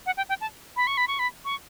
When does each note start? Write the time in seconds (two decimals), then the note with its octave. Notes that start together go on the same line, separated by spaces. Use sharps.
0.06 F#5
0.17 G5
0.29 G5
0.41 A5
0.76 B5
0.87 C#6
0.97 B5
1.08 C#6
1.19 B5
1.45 C#6